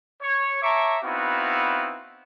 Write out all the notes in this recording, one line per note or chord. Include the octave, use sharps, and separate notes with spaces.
C#5
C#5 E5 A5 A#5 C#6 D6
B3 C4 D#4 E4 F#4 F5